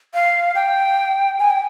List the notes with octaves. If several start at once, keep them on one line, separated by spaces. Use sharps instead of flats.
F5
G5
G#5
G5